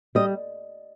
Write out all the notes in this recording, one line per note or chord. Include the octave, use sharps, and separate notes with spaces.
G3 D#5